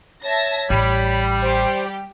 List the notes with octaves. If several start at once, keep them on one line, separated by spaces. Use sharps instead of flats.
C#5 E5 A5 A#6
A1 G3 B5
G4 C5